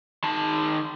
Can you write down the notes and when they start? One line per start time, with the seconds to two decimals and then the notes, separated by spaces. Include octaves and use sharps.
0.24 D#3 A5